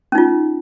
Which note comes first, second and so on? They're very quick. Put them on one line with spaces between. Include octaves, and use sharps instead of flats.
C#4 D#4 F4